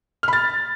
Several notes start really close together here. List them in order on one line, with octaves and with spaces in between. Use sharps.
F6 B5 A6